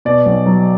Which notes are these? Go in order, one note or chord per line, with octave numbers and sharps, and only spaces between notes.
B2 D5
B1
F#3